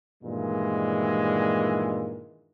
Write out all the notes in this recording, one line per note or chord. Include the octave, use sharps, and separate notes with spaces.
G2 A#2 D#3 E3 G#3